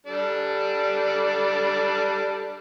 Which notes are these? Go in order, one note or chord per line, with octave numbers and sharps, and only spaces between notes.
G3 D4 A4